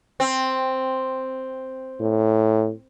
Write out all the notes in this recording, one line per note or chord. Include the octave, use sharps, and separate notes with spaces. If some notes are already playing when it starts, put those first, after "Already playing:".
C4
A2